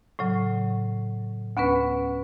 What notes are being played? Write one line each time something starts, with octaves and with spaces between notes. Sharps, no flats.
A2 C#3 F#3
D2 B3 C#4 B4